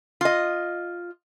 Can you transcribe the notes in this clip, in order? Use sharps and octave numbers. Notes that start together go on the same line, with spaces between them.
F4 D#5